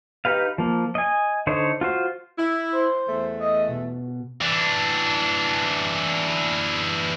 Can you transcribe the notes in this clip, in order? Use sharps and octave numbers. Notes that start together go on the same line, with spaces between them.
D#4 G4 B4 F5
F3 A#3
D#5 G#5
D3 D#4 C5 C#5
F4 F#4 C5
E4
C5
E2 A3
D#5
B2
E3 D4